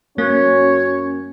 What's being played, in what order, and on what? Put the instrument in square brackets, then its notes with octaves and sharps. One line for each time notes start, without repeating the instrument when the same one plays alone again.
[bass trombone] F#2 [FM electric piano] A#3 [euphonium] C#4 [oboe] C#5